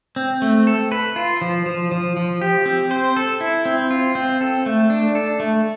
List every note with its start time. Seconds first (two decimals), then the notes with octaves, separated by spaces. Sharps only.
0.16 C4
0.42 A3
0.67 A4
0.92 B4
1.16 F4
1.42 F3
1.66 F3
1.92 F3
2.17 F3
2.41 G4
2.66 C4
2.91 C5
3.16 A4
3.41 E4
3.65 C4
3.91 F4
4.15 C4
4.41 A4
4.66 A3
4.90 D4
5.15 A4
5.40 A3